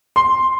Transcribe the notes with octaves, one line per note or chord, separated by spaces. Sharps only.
C6